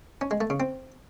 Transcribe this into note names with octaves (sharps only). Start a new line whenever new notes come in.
C#4
G#3
A3
C#3
C4